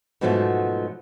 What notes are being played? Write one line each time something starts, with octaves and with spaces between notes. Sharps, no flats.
G#2 B2 F3 F#3 G#3 A3